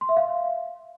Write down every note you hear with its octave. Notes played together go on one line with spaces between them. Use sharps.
C6
E5
F5